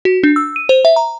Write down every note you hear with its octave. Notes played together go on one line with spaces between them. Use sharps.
F#4
D4
E6
D#7
C5
E5
A#5